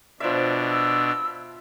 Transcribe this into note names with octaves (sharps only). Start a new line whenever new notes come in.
B2 F3 D4 D5 E5
E6